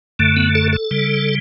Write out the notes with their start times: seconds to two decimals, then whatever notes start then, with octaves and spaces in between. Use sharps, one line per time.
0.19 F#2 D3 A3
0.37 B3
0.55 A4
0.73 A4
0.91 C#3 G3